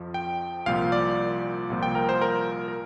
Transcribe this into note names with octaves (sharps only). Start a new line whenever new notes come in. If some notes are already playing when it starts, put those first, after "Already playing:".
Already playing: F2 F3
G5
C2 A#2 F3 F5
D5
C2 A#2 F3
G5
A#4
C5
A#4
A#4